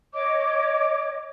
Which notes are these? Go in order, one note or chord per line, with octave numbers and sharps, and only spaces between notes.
C#5 D#5 D6